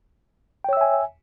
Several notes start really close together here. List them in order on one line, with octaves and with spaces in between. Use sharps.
G5 C#5 E6 E5 G#5